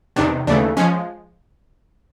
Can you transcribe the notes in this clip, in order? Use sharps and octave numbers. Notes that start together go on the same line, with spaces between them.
E2 C3 D#3 D4
D#2 C#3 E3 A3 D4
F3 G#3 C#4